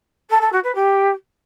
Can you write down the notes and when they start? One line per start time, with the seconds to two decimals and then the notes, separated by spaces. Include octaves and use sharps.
0.30 A4
0.41 A4
0.52 F#4
0.64 B4
0.75 G4